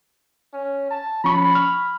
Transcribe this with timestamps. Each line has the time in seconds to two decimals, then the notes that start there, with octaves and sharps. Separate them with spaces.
0.53 C#4
0.91 A5
1.24 F3 C#4 B5 C#6
1.55 F6